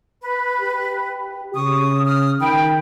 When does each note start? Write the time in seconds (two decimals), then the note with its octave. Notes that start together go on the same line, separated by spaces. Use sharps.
0.22 B4
0.61 G4
1.55 C#3 C#6 D#6
2.06 D#6 F6
2.40 D#3 G5 B5